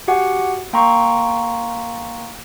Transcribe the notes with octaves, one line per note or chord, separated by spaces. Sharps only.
F#4 G4 F#5 G#5
A#3 G5 A#5 C6 C#6